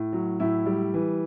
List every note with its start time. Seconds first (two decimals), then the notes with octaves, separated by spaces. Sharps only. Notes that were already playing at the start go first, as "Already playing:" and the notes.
Already playing: A2
0.13 F#3
0.40 A2 E4
0.66 G3
0.94 E3